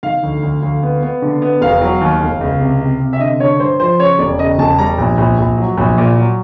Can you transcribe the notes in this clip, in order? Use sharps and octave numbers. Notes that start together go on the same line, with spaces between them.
D#3 F5
D2
D2
D2
B3
B3
D3
B3
E1 F5
F#3
D#2
E1
C#2
C3
C3
C3
E5
D3 D#5
D3 C#5
G2 C5
F3 C5
C#3 C#5
E1 D5
C#3 D#5
E1 A5
G3 A#5
A#1
A#1
A#1
F#3
A#1
A#2
F#3